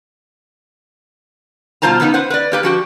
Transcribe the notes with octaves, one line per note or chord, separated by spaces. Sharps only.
B2 G3 F4 C5 A5 A#5
E2 C#3 B3 D#4
B4 C5 F#5
B4 D5
A#3 G4 B4
F3 F#4 G4